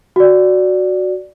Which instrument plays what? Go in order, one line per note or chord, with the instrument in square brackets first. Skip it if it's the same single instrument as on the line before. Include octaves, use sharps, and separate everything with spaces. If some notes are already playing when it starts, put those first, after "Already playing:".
[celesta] F#4 D5